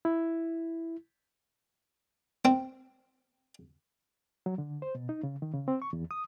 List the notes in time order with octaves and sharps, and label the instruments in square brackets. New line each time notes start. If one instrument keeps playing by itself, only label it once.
[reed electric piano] E4
[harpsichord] C4
[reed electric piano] F#3
D3
C5
B2
D#4
C#3
D#3
C#3
C4
C#6
E2
D#6